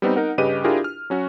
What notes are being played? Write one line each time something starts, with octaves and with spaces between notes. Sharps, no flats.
G3 B3 C4 D#4
D#4 A#4 F#5
G2 C#3 G4 B4 D#5 D#7
D4 E4 F4 G4 G#4 A#4
F6
F#3 C#4 F#4